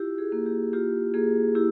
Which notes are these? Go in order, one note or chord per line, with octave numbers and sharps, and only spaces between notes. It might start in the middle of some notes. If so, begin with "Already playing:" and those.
Already playing: E4 F4 G4
G#4
A#3
G4
F4 G4
A#3 G#4
E4 G4